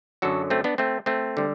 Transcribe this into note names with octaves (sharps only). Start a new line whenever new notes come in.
F#2 D3 F#3 F#4 A4
A3 C4
B3 D4
A3 C4
A3 C4
D3 G3